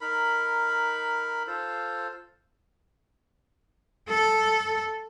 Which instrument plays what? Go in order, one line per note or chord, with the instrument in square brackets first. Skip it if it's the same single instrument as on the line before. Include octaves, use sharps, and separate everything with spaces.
[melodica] D#4 A#4 B5
F4 A4 C5
[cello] A4